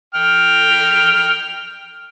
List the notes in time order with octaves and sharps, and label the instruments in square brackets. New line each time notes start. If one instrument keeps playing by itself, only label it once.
[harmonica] G5 F6